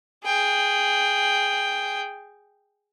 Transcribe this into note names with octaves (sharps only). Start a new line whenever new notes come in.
G#4 G5